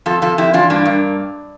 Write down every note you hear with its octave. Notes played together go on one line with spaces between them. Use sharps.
F2 F4 A4
F2 F4 A4
F2 E4 G4
E3 D4 F4
G2 A#3 D4
G2